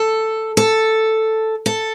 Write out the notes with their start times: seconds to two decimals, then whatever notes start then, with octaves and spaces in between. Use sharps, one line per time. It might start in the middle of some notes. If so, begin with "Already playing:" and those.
Already playing: A4
0.57 A4
1.66 A4